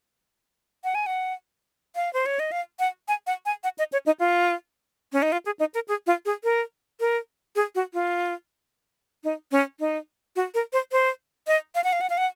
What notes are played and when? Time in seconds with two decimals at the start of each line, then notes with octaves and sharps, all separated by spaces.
0.84 F#5
0.95 G#5
1.06 F#5
1.95 F5
2.13 C5
2.26 C#5
2.39 D#5
2.52 F5
2.79 F#5
3.08 G#5
3.27 F#5
3.46 G#5
3.64 F#5
3.78 D#5
3.93 C#5
4.06 D#4
4.20 F4
5.13 C#4
5.22 D#4
5.32 F4
5.46 G#4
5.60 D#4
5.74 A#4
5.88 G#4
6.07 F4
6.26 G#4
6.44 A#4
7.00 A#4
7.56 G#4
7.75 F#4
7.94 F4
9.24 D#4
9.52 C#4
9.80 D#4
10.36 F#4
10.54 A#4
10.73 C5
10.92 C5
11.47 D#5
11.75 F5
11.84 F#5
11.93 F5
12.01 F#5
12.10 F5
12.18 F#5